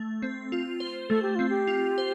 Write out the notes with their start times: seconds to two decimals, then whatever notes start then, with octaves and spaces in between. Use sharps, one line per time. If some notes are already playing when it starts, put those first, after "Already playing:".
Already playing: A3
0.22 C4
0.52 F4
0.80 C5
1.09 A3 A4
1.22 G4
1.35 C4 F4
1.49 G4
1.67 F4
1.98 C5